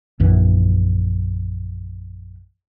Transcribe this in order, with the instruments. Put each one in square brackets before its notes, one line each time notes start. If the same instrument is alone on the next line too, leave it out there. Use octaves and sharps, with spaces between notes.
[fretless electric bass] A#1 F#2 E3